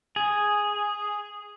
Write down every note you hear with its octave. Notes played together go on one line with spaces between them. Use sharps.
G#4